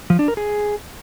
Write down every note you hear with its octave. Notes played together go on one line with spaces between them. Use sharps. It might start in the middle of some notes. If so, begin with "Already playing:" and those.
F3
D4
A#4
G#4